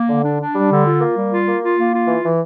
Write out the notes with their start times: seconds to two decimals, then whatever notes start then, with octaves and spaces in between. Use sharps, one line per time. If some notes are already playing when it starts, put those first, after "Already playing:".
Already playing: A#3
0.09 D3
0.24 D4
0.39 D4
0.54 G3
0.70 D3
0.85 F4
1.01 A#3
1.16 G3
1.31 F4
1.46 A#3
1.62 F4
1.78 A#3
1.93 F4
2.08 E3
2.23 E3